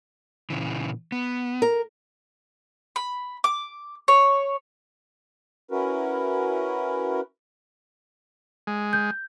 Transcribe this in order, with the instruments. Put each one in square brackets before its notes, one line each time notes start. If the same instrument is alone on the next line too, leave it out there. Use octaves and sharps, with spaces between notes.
[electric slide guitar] A#2 C#3 E3
B3
[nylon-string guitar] A#4
[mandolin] B5
D6
C#5
[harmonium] C#4 E4 F#4 A#4 B4
[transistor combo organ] G#3
[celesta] G6